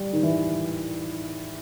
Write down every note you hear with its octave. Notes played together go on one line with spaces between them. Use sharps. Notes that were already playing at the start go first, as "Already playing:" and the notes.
Already playing: G3
D#3
E3